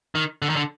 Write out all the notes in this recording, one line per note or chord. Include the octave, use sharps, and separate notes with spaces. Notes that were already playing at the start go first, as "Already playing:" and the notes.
D#3
D3
D#3
D3